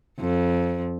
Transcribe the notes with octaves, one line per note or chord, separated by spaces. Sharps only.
F2